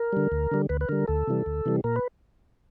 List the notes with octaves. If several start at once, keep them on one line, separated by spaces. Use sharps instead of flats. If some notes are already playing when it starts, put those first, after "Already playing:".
Already playing: A#4
D3 G3
D2
D3 G3
D2 B4
B4
D3 G3 A#4
D2 A4
C3 E3 G3
D2
C3 E3 G3
A#2 A#4
B4